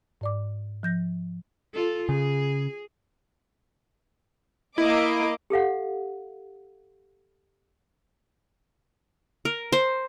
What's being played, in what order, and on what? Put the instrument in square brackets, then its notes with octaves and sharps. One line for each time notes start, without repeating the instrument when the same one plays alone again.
[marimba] G#2 D5 D6
F3 G6 A#6
[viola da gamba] F4 A4
[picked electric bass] C#3 [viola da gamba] G#4
[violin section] A#3 D#5 D6 [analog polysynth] E4
[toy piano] G4 A4 F5 F#5
[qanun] A#4
C5